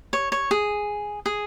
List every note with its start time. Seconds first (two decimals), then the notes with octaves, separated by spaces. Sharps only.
0.13 C#5
0.32 C#5
0.51 G#4
1.26 G#4